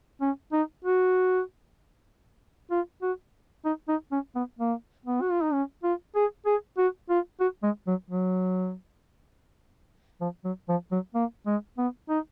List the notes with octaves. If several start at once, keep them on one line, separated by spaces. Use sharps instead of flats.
C#4
D#4
F#4
F4
F#4
D#4
D#4
C#4
B3
A#3
B3
F#4
F4
D#4
C#4
F4
G#4
G#4
F#4
F4
F#4
G#3
F#3
F#3
F3
F#3
F3
F#3
A#3
G#3
B3
D#4